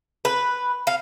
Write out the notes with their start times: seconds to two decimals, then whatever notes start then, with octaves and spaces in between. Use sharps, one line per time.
0.25 B4
0.87 F5